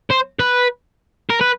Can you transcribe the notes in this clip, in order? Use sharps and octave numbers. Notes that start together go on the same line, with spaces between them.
C5
B4
A#4
B4